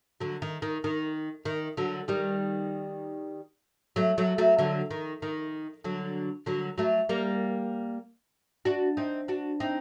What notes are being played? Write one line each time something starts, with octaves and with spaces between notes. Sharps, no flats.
D3 F#3
D#3
D#3
D#3
D#3
D3 F#3
D#3 G3
F#3 A3
F#3 A3
F#3 A3
D3 F#3
D#3
D#3
D3 F#3
D3 F#3
F#3 A3
G3 A#3
D4 F#4
C4 D#4
D4 F#4
C4 D#4